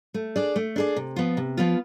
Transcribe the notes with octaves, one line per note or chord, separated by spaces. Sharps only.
A3
D4 G#4 D5
A3
D4 G#4 D5
C3
F3 B3 F4
C3
F3 B3 F4